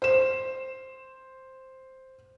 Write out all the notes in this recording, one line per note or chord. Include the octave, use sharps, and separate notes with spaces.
C5 E7